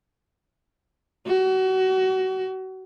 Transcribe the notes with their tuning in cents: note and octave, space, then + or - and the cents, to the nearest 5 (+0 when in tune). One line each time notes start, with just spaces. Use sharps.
F#4 +30